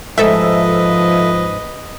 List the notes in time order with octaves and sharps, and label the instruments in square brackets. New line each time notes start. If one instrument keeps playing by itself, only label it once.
[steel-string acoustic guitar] G#2 [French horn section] F3 [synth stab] A4 E5 [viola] B4 D#5